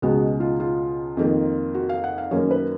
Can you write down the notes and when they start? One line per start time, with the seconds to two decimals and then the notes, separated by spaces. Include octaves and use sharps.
0.02 C#2 B2 G#3 B3 F#4
0.40 F4
0.60 F4
1.17 F2 D#3 A#3
1.74 F#4
1.89 F5
2.04 F#5
2.18 F5
2.31 F#2 D#3 A#3 C#4 C#5
2.51 B4